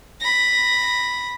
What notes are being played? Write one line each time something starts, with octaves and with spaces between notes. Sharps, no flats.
B5 A#6